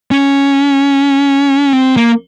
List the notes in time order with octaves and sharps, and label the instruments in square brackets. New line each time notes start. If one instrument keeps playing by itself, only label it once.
[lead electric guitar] C#4
C4
A#3